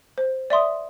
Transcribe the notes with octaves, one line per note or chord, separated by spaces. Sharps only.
C5
D5 E5 C6 D#6